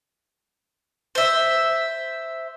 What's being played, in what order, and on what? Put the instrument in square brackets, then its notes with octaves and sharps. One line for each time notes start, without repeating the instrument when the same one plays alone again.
[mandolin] C5 E5